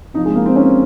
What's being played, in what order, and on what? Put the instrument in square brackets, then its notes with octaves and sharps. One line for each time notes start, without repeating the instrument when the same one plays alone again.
[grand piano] C3 F3 D#4
G#3
A#3
C4
C#4